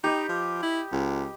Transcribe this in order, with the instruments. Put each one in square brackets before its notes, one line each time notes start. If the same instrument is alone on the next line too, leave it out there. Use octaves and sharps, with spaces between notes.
[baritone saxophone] D#4 [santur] G4 B4 D#5
[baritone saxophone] F3
E4
C#2